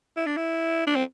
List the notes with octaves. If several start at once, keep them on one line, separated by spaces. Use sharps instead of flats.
E4
D4
E4
D4
C4